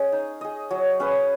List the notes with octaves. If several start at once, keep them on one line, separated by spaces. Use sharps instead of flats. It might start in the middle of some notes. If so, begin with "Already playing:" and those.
Already playing: C#4 G#4 D#5
D#4
G#4 D#5
F#3
C#4 G#4 B4